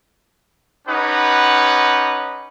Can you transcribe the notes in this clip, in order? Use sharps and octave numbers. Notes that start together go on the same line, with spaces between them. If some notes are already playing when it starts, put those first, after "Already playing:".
C#4 D#4 G4 B4 F#5